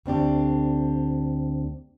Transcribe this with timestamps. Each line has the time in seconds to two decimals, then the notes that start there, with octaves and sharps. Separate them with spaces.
0.06 D2 C4 D4 G4